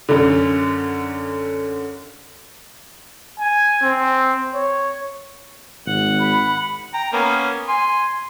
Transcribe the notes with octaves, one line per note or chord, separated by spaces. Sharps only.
F#2 D3
G#5
C4
C#5
G#1 F#5
B5
G5 A#5
A#3 B3 C#4
G#5 C6